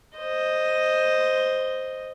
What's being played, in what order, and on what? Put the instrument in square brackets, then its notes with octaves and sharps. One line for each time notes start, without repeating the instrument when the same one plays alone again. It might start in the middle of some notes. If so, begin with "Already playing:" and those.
[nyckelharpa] C5 D#5